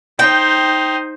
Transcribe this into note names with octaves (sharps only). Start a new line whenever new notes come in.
D#4 C5 G5